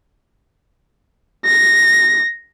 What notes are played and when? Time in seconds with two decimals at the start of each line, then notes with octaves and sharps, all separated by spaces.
1.45 A#6